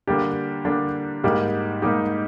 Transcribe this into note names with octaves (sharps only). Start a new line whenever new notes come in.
D3 G3 A#3 D4 G4
D3 G3 A#3 D4 G4
G#2 G3 A#3 D#4 G4
G#2 G3 A#3 D#4 G4